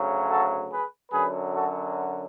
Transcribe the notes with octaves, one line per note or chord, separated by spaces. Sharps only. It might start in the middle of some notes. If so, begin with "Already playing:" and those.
Already playing: D2 C#3 F#3
F#4 A4
G#4 B4
F#2 D3 F#3 G#4 B4
F#4 A4